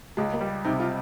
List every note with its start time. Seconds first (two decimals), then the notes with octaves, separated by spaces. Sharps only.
0.17 C#2 G#3
0.33 A#3
0.41 G3
0.64 C3 D#4
0.80 F4